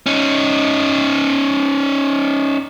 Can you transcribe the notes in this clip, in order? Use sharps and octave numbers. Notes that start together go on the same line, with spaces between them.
C#4 D#4